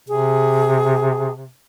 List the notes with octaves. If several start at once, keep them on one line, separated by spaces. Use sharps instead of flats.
C3 G#4